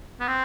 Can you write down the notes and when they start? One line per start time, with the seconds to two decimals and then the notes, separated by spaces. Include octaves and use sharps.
0.20 B3
0.28 C4